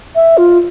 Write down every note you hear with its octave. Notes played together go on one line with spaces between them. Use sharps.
E5
F4